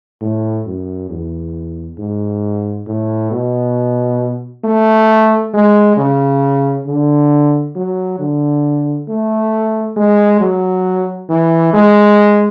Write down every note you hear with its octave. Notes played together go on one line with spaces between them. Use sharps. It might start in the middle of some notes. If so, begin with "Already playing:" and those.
A2
F#2
E2
G#2
A2
B2
A3
G#3
C#3
D3
F#3
D3
A3
G#3
F#3
E3
G#3